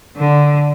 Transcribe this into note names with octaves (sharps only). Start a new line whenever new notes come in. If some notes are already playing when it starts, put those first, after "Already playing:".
D3